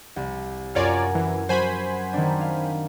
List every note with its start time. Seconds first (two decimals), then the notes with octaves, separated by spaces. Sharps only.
0.16 C2
0.75 F#2 F4 A#4 C#5 D5 G#5
1.15 E3
1.49 F#3 F#4 C5 G#5 B5
2.13 D#3 C4 D4
2.41 F5